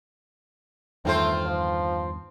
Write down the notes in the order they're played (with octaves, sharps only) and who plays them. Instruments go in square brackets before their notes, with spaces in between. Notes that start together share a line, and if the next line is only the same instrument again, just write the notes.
[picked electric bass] E2 G2 D#3 [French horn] A3 [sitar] C4 F4 C5
[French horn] F3